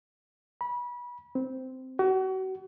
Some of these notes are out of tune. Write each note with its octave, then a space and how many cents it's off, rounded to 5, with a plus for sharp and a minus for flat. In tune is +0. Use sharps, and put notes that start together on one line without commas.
B5 -25
C4 -10
F#4 +35